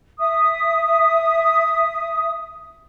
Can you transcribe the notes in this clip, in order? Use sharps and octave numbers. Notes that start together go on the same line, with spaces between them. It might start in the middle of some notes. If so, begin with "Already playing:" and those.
E5 D#6